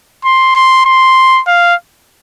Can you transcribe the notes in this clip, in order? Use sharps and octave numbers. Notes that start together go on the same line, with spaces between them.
C6
C6
C6
F5